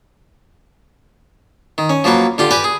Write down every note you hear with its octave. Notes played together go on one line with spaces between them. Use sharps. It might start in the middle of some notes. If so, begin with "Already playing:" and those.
D#3
C#4
F3 F#3 A#3 B4
D3 F4 G4
G4 B4 D5 G5 G#5
G#4